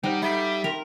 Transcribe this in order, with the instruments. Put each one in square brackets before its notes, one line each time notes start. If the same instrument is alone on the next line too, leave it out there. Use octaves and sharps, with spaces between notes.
[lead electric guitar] G3 [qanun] D#4 [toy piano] C5 F#5 G5
[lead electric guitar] G3 [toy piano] A4 D#5 B5 [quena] E5
[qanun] A#4 [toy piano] G5 C6